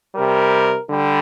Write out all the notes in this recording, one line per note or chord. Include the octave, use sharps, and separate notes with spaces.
C3 G3 A#4
D3 G3